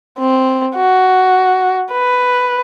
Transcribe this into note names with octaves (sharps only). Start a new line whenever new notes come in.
C4
F#4
B4